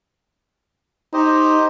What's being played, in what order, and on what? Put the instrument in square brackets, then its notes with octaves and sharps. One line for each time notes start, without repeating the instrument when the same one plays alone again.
[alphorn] D#4 [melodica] G4 C5 D#5